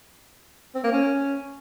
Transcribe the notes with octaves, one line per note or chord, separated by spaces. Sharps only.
C4
A#3
C#4